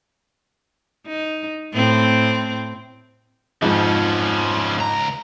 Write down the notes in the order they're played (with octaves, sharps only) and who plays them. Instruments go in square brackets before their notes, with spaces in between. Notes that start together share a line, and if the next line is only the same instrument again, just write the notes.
[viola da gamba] D#4
A2 C4
[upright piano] F2 G#2 [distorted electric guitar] F3 C#4
[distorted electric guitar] C#2 A#5